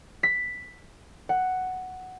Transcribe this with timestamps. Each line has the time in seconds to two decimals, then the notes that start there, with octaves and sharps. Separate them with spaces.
0.23 B6
1.29 F#5